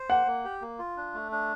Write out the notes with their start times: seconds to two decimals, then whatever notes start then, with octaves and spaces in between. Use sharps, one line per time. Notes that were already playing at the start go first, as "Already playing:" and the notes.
Already playing: C5
0.10 A#3 F#5
0.27 A#3
0.44 G4
0.62 A#3
0.79 F4
0.97 D4
1.14 A3
1.32 D4